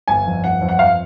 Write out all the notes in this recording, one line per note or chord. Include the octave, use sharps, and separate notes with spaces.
G1 G#5
F2
G1 F#5
F2
F#5
F2 F5